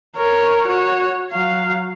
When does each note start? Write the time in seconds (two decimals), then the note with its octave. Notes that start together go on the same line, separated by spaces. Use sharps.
0.17 A#4 C#5
0.68 F#4 C#5
1.32 F#3 F5